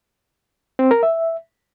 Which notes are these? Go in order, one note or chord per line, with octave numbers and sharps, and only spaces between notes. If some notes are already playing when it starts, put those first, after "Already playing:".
C4
A#4
E5